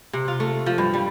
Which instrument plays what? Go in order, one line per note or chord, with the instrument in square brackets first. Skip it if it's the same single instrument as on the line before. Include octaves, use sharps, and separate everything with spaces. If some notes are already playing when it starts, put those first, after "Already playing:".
[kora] C3
F4
A3
F3
G2
G3